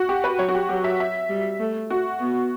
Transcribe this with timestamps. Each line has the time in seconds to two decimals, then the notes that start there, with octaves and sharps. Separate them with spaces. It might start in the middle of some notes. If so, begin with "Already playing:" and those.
Already playing: F#4
0.09 G4
0.24 B4
0.39 F#3 C#5
0.49 F#4
0.54 G4
0.69 F#3 G4
0.84 E5
1.00 E5
1.30 G3
1.60 A3
1.90 F#4
2.20 B3